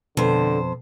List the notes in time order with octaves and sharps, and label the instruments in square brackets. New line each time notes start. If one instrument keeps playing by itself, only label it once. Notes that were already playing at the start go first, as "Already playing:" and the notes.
[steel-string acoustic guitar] F2 C5 [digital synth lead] B2 [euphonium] D3 [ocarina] A4